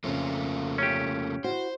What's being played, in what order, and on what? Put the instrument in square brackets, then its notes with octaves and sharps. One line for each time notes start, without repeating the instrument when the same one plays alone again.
[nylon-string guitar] F2 C#3 [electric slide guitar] A3 A#3 F4
[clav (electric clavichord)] C#4 G4
[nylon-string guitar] E4 F#4 [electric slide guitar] C5